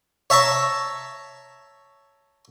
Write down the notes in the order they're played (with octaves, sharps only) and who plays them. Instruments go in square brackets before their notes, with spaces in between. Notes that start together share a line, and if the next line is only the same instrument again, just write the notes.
[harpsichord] C#5 E5 A5 A#5 C#6